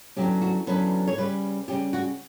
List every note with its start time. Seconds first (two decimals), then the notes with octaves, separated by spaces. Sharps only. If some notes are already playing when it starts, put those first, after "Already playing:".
0.16 E2 D3 F#3 C#4 G4
0.41 F#4
0.67 E2 D3 F#3 C#4 B4
1.07 C#5
1.17 C#3 G3 C#4 B4
1.68 C#3 G3 C#4 G4
1.93 F#4